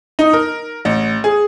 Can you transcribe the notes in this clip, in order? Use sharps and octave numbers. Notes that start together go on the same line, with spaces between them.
D#4
A#4
A1
G#4